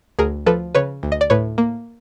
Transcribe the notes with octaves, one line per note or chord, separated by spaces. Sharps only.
D2 G#4 A#4
F3 A4 B4
C#3 B4 C#5
D2
D#5
D5
A2 B4 C#5
A#3